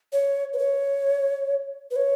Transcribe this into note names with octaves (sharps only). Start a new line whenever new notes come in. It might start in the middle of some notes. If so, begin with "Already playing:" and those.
C#5
B4
C#5
B4
C#5